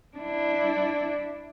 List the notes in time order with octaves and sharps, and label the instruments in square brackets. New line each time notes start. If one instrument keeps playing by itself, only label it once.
[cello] D4 E4